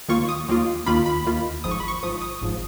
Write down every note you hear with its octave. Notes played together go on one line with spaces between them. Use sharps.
D#2 D#3 A#3 F4 C#6
D#6
D#2 D#3 A#3 F4
D#2 D#3 A#3 F4 B5
B5
D#2 D#3 A#3 F4
G#1 G#2 F3 D#6
C#6
B5
C#6
G#1 G#2 F3 D#6
D#6
G#1 G#2 F3